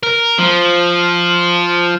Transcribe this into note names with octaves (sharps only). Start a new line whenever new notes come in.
A#4
F3